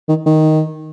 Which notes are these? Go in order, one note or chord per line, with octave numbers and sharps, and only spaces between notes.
D#3
D#3